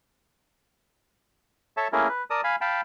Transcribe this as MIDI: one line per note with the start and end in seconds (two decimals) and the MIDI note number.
1.77 1.88 69
1.77 1.88 73
1.77 1.88 76
1.77 1.88 81
1.93 2.08 57
1.93 2.08 58
1.93 2.08 61
1.93 2.08 64
1.93 2.08 68
1.93 2.08 70
2.08 2.24 71
2.30 2.41 70
2.30 2.41 74
2.30 2.41 81
2.30 2.41 87
2.44 2.56 77
2.44 2.56 80
2.44 2.56 83
2.61 2.81 77
2.61 2.81 79
2.61 2.81 81
2.61 2.81 83